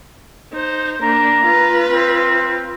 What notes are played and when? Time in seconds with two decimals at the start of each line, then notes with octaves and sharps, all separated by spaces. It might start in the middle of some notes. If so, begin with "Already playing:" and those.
0.53 D#4 C5
1.02 A#3 D4 A#5
1.46 F4 B4
1.91 C4